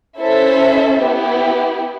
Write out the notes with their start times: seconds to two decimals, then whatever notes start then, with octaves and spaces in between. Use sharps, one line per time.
0.19 C#4 E4 A4 C5 E5
1.00 B3 E4 G4